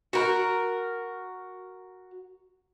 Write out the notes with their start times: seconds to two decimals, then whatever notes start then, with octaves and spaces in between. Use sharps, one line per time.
0.13 F#4 A#4